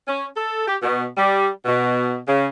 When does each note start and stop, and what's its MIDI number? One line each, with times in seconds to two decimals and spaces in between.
0.07 0.25 61
0.37 0.67 69
0.68 0.77 67
0.82 1.05 47
1.17 1.48 55
1.65 2.17 47
2.27 2.46 49